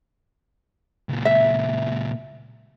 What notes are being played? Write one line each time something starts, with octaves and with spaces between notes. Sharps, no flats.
C#2 A#2
E5